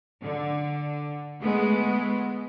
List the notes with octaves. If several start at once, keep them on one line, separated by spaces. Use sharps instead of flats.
D3
G#3 A3 B3